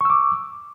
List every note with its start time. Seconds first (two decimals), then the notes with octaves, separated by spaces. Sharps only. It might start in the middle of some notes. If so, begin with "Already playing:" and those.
0.01 C#6
0.05 E6
0.10 D6